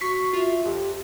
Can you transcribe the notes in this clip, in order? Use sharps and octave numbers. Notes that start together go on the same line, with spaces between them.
F#4 C#6 B6 C7
F4 E5
F2 G4